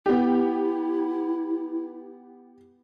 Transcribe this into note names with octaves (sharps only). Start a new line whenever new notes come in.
B3 E4 G4